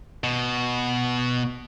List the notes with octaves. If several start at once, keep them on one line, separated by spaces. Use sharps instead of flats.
B2